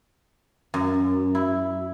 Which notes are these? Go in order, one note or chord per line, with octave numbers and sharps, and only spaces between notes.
F#2
E4